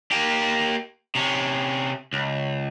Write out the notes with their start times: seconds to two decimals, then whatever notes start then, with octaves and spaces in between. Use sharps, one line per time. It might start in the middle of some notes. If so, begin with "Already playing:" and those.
0.12 A#3 G4
1.15 C3 C#4
2.13 C#2